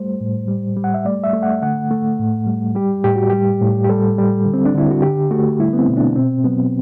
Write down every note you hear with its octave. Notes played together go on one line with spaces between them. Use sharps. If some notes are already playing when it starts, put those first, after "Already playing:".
Already playing: G3 A3 C5
A2
G3
G3
F#5
E5
A3 D5
E5
A3
F#5
D3 F#5
A3
A2
G3
G3 G4
A2 G4
F#4
G3 G4
A2
G4
G3 A4
G3
D3
C4
D4
D3 E4
F#4
D3 G4
A3 F#4
G3 E4
B3
C4
B2
D4
B2 C4
F#3 B3